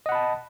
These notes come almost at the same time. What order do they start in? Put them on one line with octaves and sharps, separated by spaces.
D#5 F#5 B5 A5